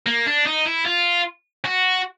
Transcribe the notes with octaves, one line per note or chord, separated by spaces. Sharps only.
A#3
D4
D#4
E4
F4
F#4